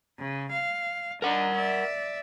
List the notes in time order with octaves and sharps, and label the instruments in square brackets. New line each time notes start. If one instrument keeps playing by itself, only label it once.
[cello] C#3
F5
[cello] D4 D#4 [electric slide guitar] A#4 F#5
[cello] D5 E5